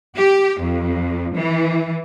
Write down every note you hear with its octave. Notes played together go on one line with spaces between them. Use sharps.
G4
F2
E3